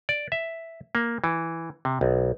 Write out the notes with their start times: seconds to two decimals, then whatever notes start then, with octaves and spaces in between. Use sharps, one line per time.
0.09 D5
0.32 E5
0.95 A#3
1.24 E3
1.85 C3
2.01 B1